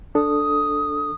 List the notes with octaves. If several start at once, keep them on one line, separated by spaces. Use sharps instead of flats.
D4 A4 D#6